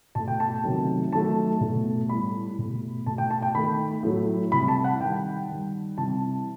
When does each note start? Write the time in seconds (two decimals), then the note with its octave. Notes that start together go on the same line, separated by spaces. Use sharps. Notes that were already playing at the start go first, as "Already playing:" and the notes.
0.15 B2 A3 A5
0.28 G5
0.40 A5
0.64 C3 D#3 F#3 A3
1.12 D#3 F#3 A3 A5
1.61 B2 A3
2.09 A2 G3 B5
2.58 B2 A3
3.06 B2 A3 A5
3.18 G5
3.31 A5
3.42 G5
3.54 D#3 A3 B5
4.03 A2 F#3 A3
4.52 C3 E3 G3 B5
4.68 A5
4.84 F#5
5.01 D#3 G3 G5
5.49 D#3 G3
5.98 C3 E3 G3 A5